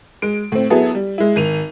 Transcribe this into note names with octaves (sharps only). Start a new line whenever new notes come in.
G#3 D7
A2 C4
F#3 B3 E4 G#4 A4
G3
G#3 E4
G#1 D#7 F7